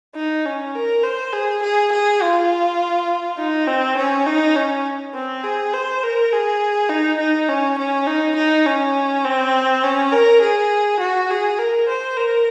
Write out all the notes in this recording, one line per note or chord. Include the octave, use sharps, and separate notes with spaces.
D#4
C#4
A#4
C5
G#4
G#4
G#4
F4
D#4
C4
C#4
D#4
C#4
C4
G#4
C5
A#4
G#4
D#4
D#4
C#4
C#4
D#4
D#4
C#4
C4
C#4
A#4
G#4
F#4
G#4
A#4
C5
A#4